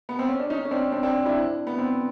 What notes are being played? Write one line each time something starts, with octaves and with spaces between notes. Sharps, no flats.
B3
C4
C#4
D4
C#4 D#4
C#4
C4 D4
C4 D4
C4 D4
D4 E4
B3
C4